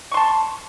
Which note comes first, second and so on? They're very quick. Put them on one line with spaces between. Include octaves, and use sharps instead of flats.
C#6 C6 A5